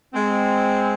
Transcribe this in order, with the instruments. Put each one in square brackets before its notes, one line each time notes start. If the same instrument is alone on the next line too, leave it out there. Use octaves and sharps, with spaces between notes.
[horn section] G#3 C4